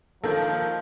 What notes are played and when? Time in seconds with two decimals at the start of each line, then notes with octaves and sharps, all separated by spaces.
0.24 D#3 F3 A#3 A4